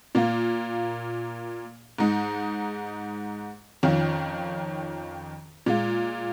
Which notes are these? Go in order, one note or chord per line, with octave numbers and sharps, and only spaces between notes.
A#2 A#3 F4
G#2 G#3 D#4
F2 D#3 C#4 F4
A#2 G#3 F4